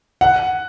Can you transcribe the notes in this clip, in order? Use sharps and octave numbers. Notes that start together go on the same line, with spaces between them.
F#5